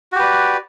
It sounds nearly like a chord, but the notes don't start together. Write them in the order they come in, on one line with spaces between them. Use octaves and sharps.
F#4 G4 B4 D5